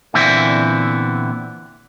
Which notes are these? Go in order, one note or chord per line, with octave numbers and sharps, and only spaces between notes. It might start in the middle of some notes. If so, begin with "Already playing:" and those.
A#2 D3 E3 B3 C4 E4